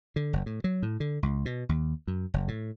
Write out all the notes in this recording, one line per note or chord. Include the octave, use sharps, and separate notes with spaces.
D3
F#1
A2
F#3
A2
D3
C#2
B2
D#2
F#2
F#1
A2